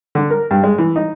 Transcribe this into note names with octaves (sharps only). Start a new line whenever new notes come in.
D3
A#4
G2
G#3
E3
D#4